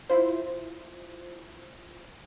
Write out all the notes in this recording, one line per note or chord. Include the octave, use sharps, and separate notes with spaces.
E4 F4 C5